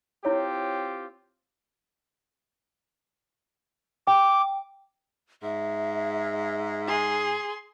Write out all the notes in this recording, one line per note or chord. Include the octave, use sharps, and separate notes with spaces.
C4 E4 F4 G4 C#5
G5 D6
G#2 E5
G#4 C6